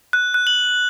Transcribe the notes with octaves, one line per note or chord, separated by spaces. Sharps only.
F#6
F#6
F#7